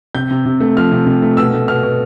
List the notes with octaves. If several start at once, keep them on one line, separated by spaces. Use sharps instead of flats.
C3 G6
C3
C3
A3
F3 F6
C3
C3
A3
B2 E6
A3
B2 F6
B2